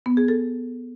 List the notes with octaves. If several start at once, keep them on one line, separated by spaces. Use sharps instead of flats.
B3
G#4
A4